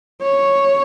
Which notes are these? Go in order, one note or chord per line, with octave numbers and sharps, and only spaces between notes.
C#5